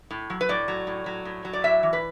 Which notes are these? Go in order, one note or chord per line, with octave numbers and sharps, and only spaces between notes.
A2
F#3
B4
A2 D5
F#3
A2
F#3
A2
F#3
D5
A2 E5
E3
B4